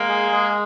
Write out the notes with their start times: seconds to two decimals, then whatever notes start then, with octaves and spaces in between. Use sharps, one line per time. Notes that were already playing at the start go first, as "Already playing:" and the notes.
Already playing: G#3 A#3
0.09 G#4
0.32 G#3